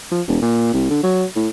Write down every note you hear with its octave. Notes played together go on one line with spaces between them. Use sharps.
F3
E1
A#2
C2
D3
F#3
A2